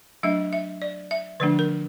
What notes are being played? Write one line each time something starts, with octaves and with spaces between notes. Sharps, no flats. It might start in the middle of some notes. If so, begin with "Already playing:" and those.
F#3 A3 D4 E5
E5
D5
E5
D3 F3 A3 D4 B4
A#4